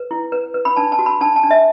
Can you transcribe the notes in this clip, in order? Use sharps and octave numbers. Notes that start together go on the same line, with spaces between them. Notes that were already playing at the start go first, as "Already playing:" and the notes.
Already playing: B4
E4
B4
B4
B5
D4 A5
A5
F#4
B5
D4 A5
A5
D4
E5